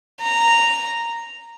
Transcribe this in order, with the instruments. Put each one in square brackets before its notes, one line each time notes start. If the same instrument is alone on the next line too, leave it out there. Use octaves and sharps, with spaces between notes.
[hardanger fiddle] A#5